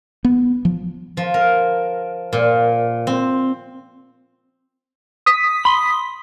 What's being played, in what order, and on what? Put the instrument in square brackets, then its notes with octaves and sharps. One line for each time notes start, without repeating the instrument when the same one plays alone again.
[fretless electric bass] B3
F3
[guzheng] F3
A#4
A#2
C4
[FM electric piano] D#6 B6
[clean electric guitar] B5 C6